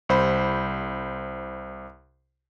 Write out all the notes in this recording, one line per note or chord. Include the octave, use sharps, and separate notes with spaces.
C2 C5 B5